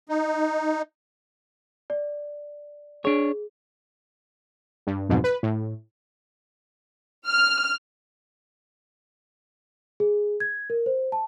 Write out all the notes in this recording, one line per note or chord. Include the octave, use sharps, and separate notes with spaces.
D#4
D5
D4 G#4 C#5
G2
B1 F2 G#2 B2
B4
A2
F6
G#4
G#6
A#4
C5
A5